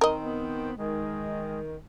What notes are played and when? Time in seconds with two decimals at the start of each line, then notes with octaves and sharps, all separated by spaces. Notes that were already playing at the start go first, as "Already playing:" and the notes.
0.01 D#3 C4 A#4 D#5
0.22 B3
0.78 D#3 G#3